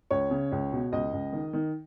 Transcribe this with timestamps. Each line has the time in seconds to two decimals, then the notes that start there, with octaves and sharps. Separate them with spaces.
0.11 C#2 C#5
0.31 C#3
0.52 C#2
0.73 B2
0.92 C#2 D#5
1.13 C#2
1.33 D#3
1.53 D#3